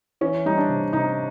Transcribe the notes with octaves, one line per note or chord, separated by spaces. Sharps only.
E3 C#4
G3 D#4
D4
C3
C3 D#4